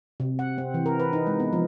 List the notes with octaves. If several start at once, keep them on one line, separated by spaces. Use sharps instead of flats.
C3
F#5
C4
E3
A#4
B4
D#4
G#3
B3
F3